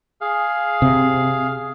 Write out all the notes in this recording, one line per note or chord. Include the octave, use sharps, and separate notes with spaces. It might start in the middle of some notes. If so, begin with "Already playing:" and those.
G#4 F5
C3